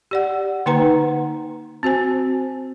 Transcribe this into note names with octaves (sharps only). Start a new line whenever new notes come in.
G4 D5 F#5
D3 A#3 D#4 B4 F#5 A#5
C4 F#4 C5 G#5